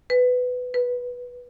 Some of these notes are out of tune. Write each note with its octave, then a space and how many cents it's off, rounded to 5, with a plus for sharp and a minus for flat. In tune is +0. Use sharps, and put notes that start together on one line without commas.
B4 +15
B4 -10